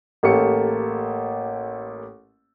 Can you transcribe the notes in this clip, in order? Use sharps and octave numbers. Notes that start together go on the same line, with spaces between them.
A1 A#3 G4 A4 C#6 C#7